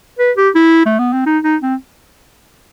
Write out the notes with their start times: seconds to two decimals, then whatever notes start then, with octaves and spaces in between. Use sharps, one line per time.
0.19 B4
0.37 G4
0.55 E4
0.86 A3
0.99 B3
1.13 C4
1.26 D#4
1.44 D#4
1.62 C4